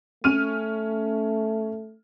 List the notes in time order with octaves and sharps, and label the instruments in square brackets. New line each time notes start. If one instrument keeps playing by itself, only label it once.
[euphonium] A3 [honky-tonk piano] C#4 F6 D#7